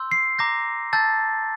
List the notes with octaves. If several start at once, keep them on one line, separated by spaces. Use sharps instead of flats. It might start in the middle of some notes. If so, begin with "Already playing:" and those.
Already playing: C6 E6 G6
C7
A#5 D6 G6 A#6
A5 E6 G6 A6